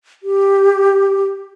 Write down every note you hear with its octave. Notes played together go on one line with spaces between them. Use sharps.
G4